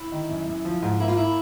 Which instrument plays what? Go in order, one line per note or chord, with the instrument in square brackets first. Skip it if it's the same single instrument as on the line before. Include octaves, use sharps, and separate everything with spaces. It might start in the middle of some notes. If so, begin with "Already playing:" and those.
Already playing: [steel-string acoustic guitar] E4
[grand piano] D#3
F#2
F#2
F3
G#2
[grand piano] A#3 [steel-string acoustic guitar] E4
[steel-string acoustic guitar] F4
E4